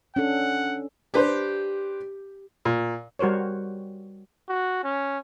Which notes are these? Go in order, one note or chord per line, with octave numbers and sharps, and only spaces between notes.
C#4 D4 A4 F#5
D4 G4 B4 C5
A#2
G3 F#4 A#4 C5 C#5
F#4
C#4